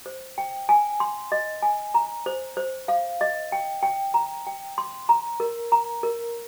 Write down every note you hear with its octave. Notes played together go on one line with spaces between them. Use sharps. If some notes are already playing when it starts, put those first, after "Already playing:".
C5
G5
G#5
C6
D#5
G#5
A#5
C5
C5
F5
D#5
G5
G5
A#5
G5
C6
A#5
A#4
A#5
A#4